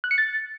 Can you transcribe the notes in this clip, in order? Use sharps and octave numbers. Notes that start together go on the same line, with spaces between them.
F#6
C#7
A6